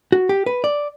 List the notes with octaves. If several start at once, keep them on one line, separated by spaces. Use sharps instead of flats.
F#4
G4
B4
D5